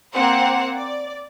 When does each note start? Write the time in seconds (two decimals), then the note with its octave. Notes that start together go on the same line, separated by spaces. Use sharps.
0.13 A#3 C4 C5 F#5
0.74 D5